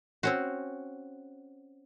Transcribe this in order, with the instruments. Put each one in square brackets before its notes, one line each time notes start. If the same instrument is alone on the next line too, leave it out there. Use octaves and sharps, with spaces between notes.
[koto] C4 C#4 F#4